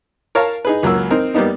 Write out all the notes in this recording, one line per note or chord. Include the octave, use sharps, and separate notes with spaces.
A#4 C#5 F5 A5 A#5
D#4 G#4 B4
C#2 F#3 A#3 E6
C4 D#4 A#4
G3 A#3 B3 D#4